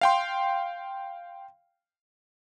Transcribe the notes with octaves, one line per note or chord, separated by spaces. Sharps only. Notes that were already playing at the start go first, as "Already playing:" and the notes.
F5 G5 C6